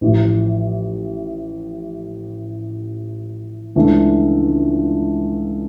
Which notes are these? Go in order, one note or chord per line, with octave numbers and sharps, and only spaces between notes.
A1 A2 F3
C#2 C#3 E3 A3 D4